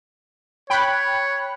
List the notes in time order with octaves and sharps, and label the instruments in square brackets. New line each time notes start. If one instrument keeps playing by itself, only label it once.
[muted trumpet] C#5 [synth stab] G5 B5 F#6